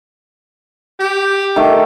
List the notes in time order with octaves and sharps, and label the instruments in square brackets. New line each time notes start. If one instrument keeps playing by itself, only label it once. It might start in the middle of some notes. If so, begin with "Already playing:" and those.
[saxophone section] G4
[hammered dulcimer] D#3 A3